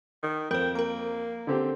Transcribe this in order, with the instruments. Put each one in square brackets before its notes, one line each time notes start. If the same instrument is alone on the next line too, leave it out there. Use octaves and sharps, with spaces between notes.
[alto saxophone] D#3
[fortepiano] F2 [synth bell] A#4 C5 [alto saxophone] G5
[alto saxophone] A#3 [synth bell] A#4 A#5
[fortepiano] D3 C4 G4